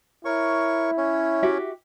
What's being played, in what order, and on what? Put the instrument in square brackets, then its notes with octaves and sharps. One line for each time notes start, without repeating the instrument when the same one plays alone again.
[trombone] E4 [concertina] A#4 C#5 C#6
[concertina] C#4 C#5
[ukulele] F#4 G4 E5